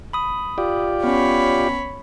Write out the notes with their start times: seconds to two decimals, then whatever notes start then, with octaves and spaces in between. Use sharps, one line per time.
0.13 B5 D#6
0.58 F4 G4 D5
1.04 B3 C#4 C#5 B5